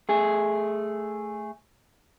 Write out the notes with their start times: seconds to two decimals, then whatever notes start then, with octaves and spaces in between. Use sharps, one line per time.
0.09 A3 G#4